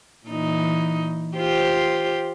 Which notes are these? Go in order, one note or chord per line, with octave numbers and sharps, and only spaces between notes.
A#2 E3 D#4
F4 G4 C5